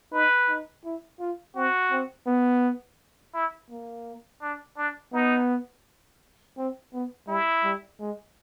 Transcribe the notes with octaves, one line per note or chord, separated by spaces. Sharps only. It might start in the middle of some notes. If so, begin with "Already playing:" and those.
D#4 B4
D#4
E4
F4
C4 F#4
C4
B3
E4
A#3
D4
D4
B3 D#4
C4
B3
G3 E4
G3
G#3